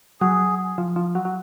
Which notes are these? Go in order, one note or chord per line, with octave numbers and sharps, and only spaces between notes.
F#3 G#4
F3
F3
F#3
F#3